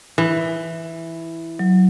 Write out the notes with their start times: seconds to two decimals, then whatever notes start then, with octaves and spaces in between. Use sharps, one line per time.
0.18 E3
1.59 F#3